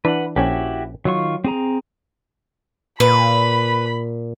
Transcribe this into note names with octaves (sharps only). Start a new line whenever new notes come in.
E3 D4 B4 F#5
A#1 C#4 E4 F#4 G4 G5
D#3 F#3 F4 C#6
C4 G#4 A#5
A#2 B4 B5